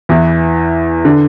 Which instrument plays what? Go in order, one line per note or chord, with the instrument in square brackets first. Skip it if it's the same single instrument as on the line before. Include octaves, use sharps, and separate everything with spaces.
[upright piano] E2 E3
D3